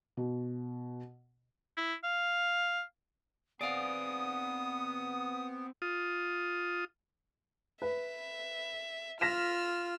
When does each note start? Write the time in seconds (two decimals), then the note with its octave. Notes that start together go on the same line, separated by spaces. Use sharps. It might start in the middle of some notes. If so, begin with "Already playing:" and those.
0.17 B2
1.77 E4
2.04 F5
3.61 B3 C4 G#4 D5 F5 D#6
5.82 F4 D#6
7.82 B4 E5
9.21 F4 E6 F6 A#6 B6 E7